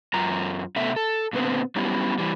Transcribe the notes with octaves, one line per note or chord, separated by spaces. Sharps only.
F#2 F4 A#5
C3 A3 B3 E5
A4
A#2 D3 B3 C4
F#3 G3 B3 C#4 E4 G4
E3 G3